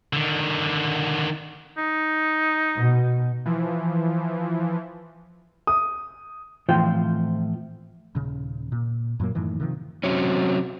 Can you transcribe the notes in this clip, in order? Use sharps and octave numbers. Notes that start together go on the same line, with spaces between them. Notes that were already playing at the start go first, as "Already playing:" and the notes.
D3 D#3
D#4
B2
E3 F3
D#6
A2 E3 F3 C4 F4 G5
D#1 C#3
A#2
F#2 A#2 F#3 A#3
F#2 A2 D#3 E3
C3 D#3 F3
C3 F#3 C4 C#4